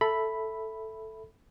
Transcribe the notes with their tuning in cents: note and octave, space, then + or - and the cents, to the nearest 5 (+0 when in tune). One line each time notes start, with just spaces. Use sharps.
A4 +0 E5 +0 B5 +0